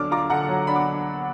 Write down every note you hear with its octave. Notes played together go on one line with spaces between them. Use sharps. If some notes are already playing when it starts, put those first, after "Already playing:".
Already playing: D3 F#3 D4 D6 F6
F4 A#5 D6
D3 F#5 A#5
F#3
D4 B5
D6